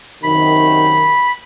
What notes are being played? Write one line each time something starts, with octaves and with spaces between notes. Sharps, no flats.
F#2 C3 D#3 B5